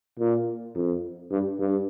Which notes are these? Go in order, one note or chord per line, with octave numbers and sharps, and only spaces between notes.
A#2
F2
G2
G2